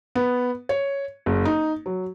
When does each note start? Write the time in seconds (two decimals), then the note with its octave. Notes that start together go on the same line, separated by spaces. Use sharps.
0.15 B3
0.69 C#5
1.26 F#1
1.45 D#4
1.86 F#3